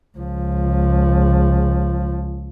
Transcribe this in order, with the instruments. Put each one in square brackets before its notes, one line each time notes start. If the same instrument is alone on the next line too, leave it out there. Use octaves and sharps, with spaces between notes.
[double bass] C#2 F3